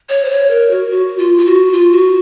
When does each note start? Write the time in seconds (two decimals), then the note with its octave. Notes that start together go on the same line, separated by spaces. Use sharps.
0.09 C#5
0.24 C5
0.29 C#5
0.50 A#4
0.70 F#4
0.90 F#4
1.18 F4
1.37 F4
1.45 F#4
1.72 F4
1.92 F#4